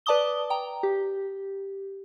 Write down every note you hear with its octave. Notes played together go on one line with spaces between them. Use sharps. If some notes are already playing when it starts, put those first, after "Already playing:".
B4 D5 A5 D6 D#6 G7
G5 A#5
G4